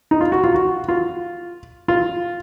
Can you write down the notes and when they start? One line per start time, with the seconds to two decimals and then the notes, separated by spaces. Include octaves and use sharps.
0.11 D#4
0.21 F4
0.32 F#4
0.44 F4
0.55 F#4
0.89 F4
1.88 F4